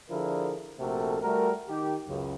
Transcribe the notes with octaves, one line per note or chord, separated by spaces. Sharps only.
D3 F3 D4 E4 G#4 A#4
A#1 C3 A3 F#4 A4 A#4
G3 A3 F#4 A#4
D#3 G4
C#2 F#2 C#3